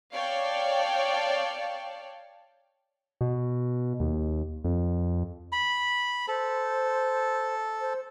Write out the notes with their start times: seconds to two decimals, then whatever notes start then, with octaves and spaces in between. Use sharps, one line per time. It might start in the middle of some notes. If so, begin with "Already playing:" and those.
0.14 C#5 D5 F5 G5 A5
3.21 B2
4.00 D#2
4.65 F2
5.52 B5
6.28 A4 C5
7.81 C5